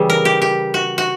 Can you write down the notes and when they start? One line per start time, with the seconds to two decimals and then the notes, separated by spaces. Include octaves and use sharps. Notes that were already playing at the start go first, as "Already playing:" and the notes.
Already playing: C#3 E3 G3
0.10 A#4
0.25 G4
0.42 G4
0.74 F#4
0.98 F#4